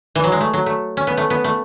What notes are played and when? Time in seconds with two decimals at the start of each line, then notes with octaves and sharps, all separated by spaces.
0.15 E3
0.24 F#3
0.32 G#3
0.41 A3
0.54 F#3
0.66 A3
0.97 C#4
1.07 B3
1.17 A3
1.30 B3
1.44 A3